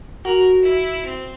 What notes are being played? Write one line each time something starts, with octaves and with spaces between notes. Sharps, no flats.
F#4 A#4
E4
C4